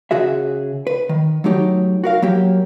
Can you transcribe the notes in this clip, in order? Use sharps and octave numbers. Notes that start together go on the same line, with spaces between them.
C#3 F#4 G#4 E5
B4
D#3
F#3 A3 D#4 G4 C#5
F#4 A#4 F5
F#3 A#3 G4